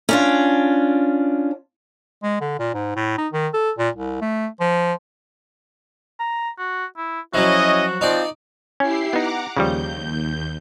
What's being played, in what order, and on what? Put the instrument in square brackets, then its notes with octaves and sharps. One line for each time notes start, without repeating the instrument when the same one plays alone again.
[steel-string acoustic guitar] C#4 D4 F4
[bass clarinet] G#3
D3
A#2
G#2
A2
D#4
D#3
A4
A#2
C2
A3
F3
[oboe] A#5
F#4
E4
[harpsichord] F3 F#3 [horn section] C#4 E4 D#5 [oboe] F#4
[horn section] F3 C4 [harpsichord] D#4 D5
[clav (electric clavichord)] C#4 [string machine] E4 G4 C7
[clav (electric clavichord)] B3 D#4 [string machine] F#5 A#5 D6
[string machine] D#2 G6 [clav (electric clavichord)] C#3 F3 G3